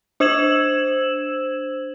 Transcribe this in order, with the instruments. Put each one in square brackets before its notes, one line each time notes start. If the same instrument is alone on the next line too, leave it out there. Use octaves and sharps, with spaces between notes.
[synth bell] D4 C5 E6 G#6 E7 F#7